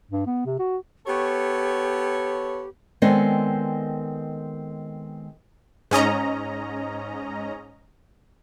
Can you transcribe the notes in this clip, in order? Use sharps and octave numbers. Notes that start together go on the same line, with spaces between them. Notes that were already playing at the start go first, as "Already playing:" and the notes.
G2
B3
C3
F#4
B3 G4 A4 C#5
D#3 G#3 B3 C4 A4 D5
G#2 C#4 D#5 A#5